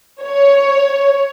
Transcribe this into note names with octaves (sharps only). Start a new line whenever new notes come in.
C#5